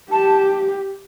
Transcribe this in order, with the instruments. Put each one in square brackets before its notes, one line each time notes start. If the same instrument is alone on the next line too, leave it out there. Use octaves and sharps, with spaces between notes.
[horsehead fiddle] G4 [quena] A5